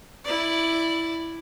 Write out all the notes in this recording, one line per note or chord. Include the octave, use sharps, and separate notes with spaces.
E4 D5